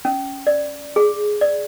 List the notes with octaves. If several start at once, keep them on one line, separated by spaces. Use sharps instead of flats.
C#4
D5
G#4
D5